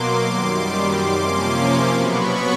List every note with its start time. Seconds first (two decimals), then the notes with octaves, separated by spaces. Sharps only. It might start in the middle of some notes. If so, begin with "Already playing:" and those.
Already playing: B2 F#3 A#3 C6 D6
0.24 F#2 D#3 G3
1.08 C3 F3 A#3 C#4 C6 D6
1.92 B2 F#3 B3 B5 C#6